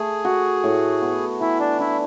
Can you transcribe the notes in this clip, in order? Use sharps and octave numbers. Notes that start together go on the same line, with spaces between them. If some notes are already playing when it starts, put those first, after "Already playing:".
Already playing: A3 G#4
F#4
A2
B3
E3 E4
D4
D4 E4